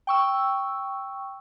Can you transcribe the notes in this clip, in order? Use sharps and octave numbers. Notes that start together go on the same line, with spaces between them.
G5 C#6 E6